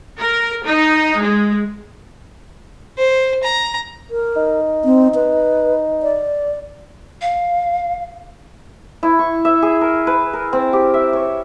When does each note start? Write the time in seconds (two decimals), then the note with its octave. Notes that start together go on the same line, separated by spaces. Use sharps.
0.19 A#4
0.66 D#4
1.21 G#3
2.98 C5
3.44 A#5
4.11 A#4
4.37 D#4
4.85 C4
5.15 B4
6.03 D5
7.21 F5
9.03 E4
9.19 C#6
9.45 E5
9.62 G#4
9.81 A#4
10.07 B4
10.33 A#4
10.53 C4
10.73 G4
10.94 E5
11.13 C#5